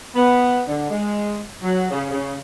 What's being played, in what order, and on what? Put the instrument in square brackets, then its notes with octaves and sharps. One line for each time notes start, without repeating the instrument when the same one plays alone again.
[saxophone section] B3
D3
G#3
F#3
C#3
C#3